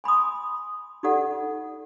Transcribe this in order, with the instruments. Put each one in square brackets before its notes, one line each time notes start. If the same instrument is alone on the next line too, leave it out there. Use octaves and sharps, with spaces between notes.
[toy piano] G#5 B5 C6 D#6
D#4 F4 G4 A4 D5 F#5